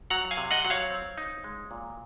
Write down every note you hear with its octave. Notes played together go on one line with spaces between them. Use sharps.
F#3 F#5 A#5
F5 G#5
C3
D#5 F#5
F#3 F#5
C#5 F5
C4
D#4
G#3
A#2